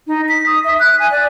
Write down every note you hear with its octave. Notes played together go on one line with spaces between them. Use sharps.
D#4
B6
D#6
E5
F#6
G#5
D5